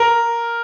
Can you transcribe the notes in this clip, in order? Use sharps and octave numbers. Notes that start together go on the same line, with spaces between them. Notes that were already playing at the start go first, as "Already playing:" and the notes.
Already playing: A#4